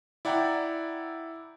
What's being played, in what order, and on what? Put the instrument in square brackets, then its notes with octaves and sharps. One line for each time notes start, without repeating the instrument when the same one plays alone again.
[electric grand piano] E4 D5 F#5 G5 A#5